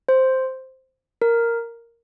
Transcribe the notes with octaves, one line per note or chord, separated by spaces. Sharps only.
C5
A#4